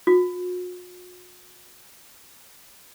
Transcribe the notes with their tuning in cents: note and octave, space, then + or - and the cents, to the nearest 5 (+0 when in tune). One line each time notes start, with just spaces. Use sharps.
F#4 -45